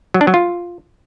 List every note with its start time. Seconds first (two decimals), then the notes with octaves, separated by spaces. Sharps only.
0.14 F#3
0.21 D4
0.27 F#3
0.34 F4